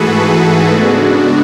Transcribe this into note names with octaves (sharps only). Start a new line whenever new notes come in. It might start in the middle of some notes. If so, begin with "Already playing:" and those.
Already playing: G#2 E3 A3 F#4 G#4 A4 B4
C#3 G#3 B3 D4 F#4